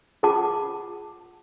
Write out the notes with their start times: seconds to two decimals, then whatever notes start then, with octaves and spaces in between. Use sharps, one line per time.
0.23 F4 G#4 F#5 A5 D6